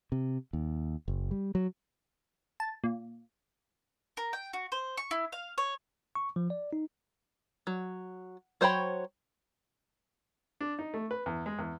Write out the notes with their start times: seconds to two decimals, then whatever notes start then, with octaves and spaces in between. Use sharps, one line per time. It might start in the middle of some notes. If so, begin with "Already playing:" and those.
0.12 C3
0.53 D#2
1.08 F#1
1.31 G3
1.55 F#3
2.60 A5
2.84 A#2
4.17 A#4
4.33 G5
4.53 F#4
4.72 C5
4.97 C#6
5.11 E4
5.32 F5
5.58 C#5
6.15 C#6
6.36 F3
6.50 D5
6.73 D#4
7.67 F#3
8.61 F#3 C5 C#5 G5 B5
10.61 D4
10.79 D#4
10.94 A3
11.11 B4
11.26 E2
11.46 G#3
11.59 E2